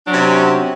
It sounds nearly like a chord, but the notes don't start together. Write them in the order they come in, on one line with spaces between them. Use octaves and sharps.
F#3 D4 C#4 C3